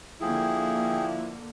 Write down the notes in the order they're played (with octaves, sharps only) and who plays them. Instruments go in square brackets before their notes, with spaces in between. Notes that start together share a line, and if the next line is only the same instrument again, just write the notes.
[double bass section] D3 A#3 [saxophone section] F3 E4 [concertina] G#4 [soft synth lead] G5